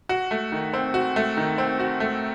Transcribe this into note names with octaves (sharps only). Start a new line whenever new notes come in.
F#4
A3
D#3
C4
F#4
A3
D#3
C4
F#4
A3